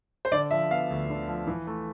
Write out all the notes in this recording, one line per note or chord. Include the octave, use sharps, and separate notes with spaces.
C5
D3 D5
F3 E5
B3 F5
D2
D3
F3
E3
A3